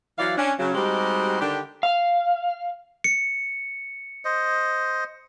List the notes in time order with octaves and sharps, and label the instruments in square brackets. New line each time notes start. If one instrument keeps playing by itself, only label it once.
[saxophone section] E3 F#3 E4 D5 F5
C#4 D4
C#3 F#3
G3 G#3 C4 D#4 F#4 G4
D3 D#3 D4 G4
[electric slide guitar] F5
[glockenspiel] C#7
[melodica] C5 D#5